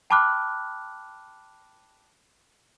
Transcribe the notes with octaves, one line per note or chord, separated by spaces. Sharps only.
G5 A5 B5 D6 F6 F#6